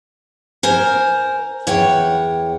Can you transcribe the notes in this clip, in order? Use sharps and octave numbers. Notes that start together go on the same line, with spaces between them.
A#4 C5 G#5 A#5
E2 C#5 F#5 G5